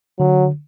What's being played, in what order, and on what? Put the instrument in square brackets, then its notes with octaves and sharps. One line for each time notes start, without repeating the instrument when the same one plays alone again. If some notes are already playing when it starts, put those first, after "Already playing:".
[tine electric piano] D3 [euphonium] F#3